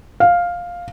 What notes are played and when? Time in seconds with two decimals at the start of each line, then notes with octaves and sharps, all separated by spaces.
0.20 F5